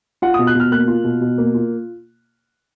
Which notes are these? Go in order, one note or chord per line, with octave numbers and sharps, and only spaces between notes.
F4 F#5
B2 D#6
F#6
B2
F6
A#3 F#6
F4
B2
B2
A#3
F4